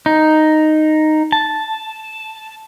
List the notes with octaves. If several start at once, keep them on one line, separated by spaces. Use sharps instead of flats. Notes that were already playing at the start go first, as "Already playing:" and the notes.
D#4
A5